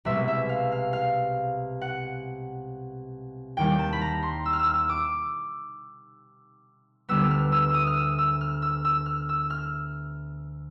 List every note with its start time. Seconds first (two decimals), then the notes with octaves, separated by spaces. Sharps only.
0.05 C2 B2 G#3 E5
0.28 E5
0.49 F5
0.72 F5
0.93 F5
1.81 F#5
3.57 D#2 D#3 G3 G5
3.79 A5
3.93 B5
4.01 A#5
4.23 C6
4.45 E6
4.53 F6
4.59 E6
4.66 F6
4.74 E6
4.89 D6
7.09 D2 D3 G3 B3 E6
7.31 F6
7.52 E6
7.69 D#6 E6
7.87 F6
7.96 E6
8.18 E6
8.41 F6
8.62 E6
8.85 E6
9.06 F6
9.29 E6
9.50 F6